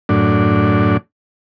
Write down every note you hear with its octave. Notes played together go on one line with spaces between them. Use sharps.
F#2 A2 D4